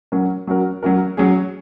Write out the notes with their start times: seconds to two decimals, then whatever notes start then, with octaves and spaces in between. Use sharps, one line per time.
0.12 F#3 C#4 F#4 A#4
0.47 F#3 C#4 F#4 A#4
0.83 F#3 C#4 F#4 A#4
1.17 F#3 C#4 G#4